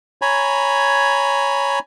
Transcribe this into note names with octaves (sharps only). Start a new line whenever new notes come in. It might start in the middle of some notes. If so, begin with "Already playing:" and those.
C#5 G#5 A#5 B5